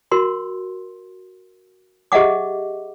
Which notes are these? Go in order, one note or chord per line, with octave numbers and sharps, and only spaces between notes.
F#4 A#4 C6
G4 G#4 D#5 E5 F#5 D6